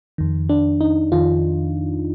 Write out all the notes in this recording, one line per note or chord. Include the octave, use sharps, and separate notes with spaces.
F2 D#3
D4
D#4
F2 D#3 F4